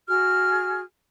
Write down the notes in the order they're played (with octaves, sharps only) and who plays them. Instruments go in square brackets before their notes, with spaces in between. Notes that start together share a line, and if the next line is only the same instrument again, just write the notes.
[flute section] F#4 G#4 F6